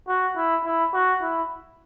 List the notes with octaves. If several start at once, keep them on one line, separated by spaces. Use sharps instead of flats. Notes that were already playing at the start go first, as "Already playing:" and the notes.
F#4
E4
E4
F#4
E4